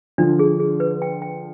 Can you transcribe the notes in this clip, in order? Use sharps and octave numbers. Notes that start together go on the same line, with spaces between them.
D3 F3 D4
G#4
G#4
B4
G5
G5